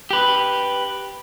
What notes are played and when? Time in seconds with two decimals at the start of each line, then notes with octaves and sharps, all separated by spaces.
0.11 G4 B4